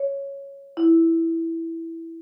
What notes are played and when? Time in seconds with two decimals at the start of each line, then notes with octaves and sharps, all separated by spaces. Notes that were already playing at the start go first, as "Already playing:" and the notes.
Already playing: C#5
0.77 E4